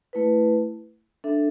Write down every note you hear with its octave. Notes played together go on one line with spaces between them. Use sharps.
A3 E4 B4
D4 A4 E5